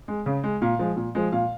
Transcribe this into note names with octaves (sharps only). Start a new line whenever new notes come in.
G#3
C#3
G#3
A#2 F5
F3 G#3
A#2
F3 G#3
A#2 F5